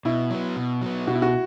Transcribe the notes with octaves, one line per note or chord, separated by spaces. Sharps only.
B2 E4
F#3 B3
B2
F#3 B3
B2 F#4
E4
F#4